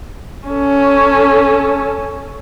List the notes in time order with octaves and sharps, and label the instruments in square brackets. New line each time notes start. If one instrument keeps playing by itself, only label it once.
[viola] C#4 A4